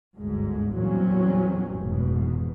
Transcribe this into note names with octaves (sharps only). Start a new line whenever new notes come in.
G1 D2 G#2
E2 A#2 F#3 G3 C4 C#4
F1 E2 G#2 B2